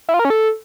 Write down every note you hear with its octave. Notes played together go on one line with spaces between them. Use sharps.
E4
F4
A#4
C#4
A4